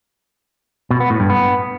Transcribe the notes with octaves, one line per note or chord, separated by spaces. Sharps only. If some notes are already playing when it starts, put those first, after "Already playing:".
B2
B3
A2
G2
B3